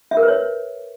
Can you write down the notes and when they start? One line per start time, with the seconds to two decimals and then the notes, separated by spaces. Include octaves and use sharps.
0.11 E5
0.17 A#4
0.23 B4
0.28 C#5